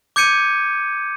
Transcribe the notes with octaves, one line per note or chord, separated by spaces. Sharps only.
D6 G6 G#6 C#7 D#7